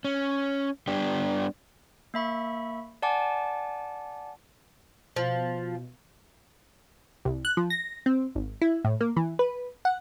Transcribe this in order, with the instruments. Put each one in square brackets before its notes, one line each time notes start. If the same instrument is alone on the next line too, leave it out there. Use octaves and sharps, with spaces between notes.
[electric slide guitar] C#4
G3 B3 D4 G4
[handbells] A#3 E5 B5 C#6
D5 F#5 G#5 A5 D6
[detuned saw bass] B2 [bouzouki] F3
[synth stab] C2
F#6
F3
A#6
C4
G#1
E4
A2
A#3
E3
B4
F#5